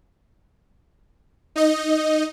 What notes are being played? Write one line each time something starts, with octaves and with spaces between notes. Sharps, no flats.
D#4 D#5